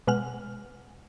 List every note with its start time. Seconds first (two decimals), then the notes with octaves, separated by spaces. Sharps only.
0.07 B2 G#3 F#5 F6